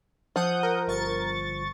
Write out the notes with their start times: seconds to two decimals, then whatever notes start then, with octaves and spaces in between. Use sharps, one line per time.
0.36 F3 F#5 D#6 G6
0.63 A#4
0.87 G1 C#6 A6